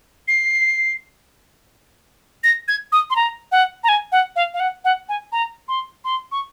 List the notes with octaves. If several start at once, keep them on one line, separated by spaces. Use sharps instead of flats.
C7
A#6
G#6
D#6
C6
A#5
F#5
A#5
G#5
F#5
F5
F5
F#5
F#5
G#5
A#5
C6
C6
C#6